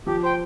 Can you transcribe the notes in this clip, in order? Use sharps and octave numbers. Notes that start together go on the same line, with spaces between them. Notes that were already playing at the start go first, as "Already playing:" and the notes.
F3 G4
C5 G5